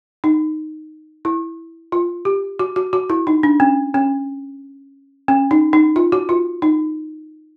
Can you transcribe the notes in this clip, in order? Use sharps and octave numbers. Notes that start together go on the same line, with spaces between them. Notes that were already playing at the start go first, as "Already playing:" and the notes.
D#4
E4
F4
G4
F#4
F#4
F#4
E4
D#4
D4
C#4
C#4
C#4
D#4
D#4
F4
F#4
F4
D#4